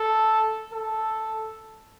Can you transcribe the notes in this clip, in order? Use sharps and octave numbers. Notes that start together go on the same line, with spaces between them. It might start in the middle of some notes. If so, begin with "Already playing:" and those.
Already playing: A4
A4